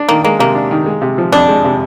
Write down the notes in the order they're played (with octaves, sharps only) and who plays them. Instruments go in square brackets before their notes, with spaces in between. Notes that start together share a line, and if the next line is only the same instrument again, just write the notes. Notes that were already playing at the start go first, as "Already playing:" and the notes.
Already playing: [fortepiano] D4
[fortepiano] D#3 [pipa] A#3
[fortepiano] G#3 [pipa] A#3
[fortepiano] C3 [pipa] A#3
[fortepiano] D4
D#3
G#3
C3
F3
[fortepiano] F2 [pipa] D4
[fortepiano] G#3
C3